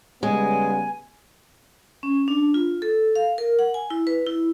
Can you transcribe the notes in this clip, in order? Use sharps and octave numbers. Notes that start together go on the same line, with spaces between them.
C#3 G3 G#3 B3 G#5
C#4
D4
F4
A4
F5
A#4
F#5
G#5
E4
B4
E4